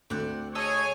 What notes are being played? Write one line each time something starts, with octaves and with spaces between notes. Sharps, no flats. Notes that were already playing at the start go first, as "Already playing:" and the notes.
D2 C4 D5 F#5
G#4 C#5 D#5 G#5 A5 E6